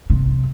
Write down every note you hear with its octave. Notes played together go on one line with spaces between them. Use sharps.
C3